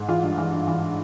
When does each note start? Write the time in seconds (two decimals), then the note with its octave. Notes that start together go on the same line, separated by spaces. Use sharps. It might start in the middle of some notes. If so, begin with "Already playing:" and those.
Already playing: G#2
0.08 E3 F4
0.23 G2
0.38 E3
0.53 G2
0.68 E3